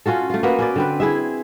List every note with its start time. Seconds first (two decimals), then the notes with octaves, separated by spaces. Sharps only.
0.06 C#4 F4 F#4 A4
0.30 A3 F4
0.43 A#3 B3 F#4 B4
0.59 C#4 B4 D5
0.76 D3 C4 B4
1.00 E4 G#4 E5